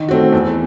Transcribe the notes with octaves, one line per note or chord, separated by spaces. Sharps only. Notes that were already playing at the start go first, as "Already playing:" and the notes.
Already playing: D#3
A3 C4 F#4
E2